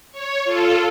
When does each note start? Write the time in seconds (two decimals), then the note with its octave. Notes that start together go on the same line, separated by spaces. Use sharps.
0.12 C#5
0.44 F4 A4